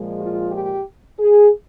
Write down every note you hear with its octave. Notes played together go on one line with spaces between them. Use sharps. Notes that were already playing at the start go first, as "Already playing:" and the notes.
Already playing: A#2 F3 G#3
F4
G4
G#4